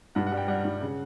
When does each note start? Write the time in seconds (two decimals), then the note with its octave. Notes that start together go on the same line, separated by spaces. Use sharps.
0.15 G2 F#5
0.26 F#5
0.32 G3
0.37 G5
0.48 G3 F#5
0.65 G2
0.81 C#3